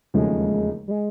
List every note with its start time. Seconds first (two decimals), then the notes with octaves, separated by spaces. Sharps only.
0.14 E1 D#2 C#3 F3 G#3 A3
0.88 G3
0.91 G#3